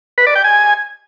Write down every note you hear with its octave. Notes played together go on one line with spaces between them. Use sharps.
B4
D5
G5
G#5